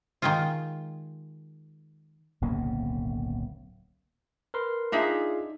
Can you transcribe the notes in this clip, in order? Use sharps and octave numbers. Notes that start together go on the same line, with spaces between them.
D#3 G#3 F4
D1 B1 C#3 A#3
A#4 B4 C6
D4 D#4 F4 G#4 E5